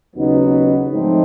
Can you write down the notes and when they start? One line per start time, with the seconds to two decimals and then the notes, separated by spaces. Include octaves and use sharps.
0.15 D#2 C#3 F#3 B3 D#4
0.91 G#2 F3 A3 C4 D#4